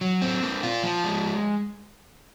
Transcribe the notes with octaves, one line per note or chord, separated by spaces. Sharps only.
F#3
C4
A#3
F4
F3
G#3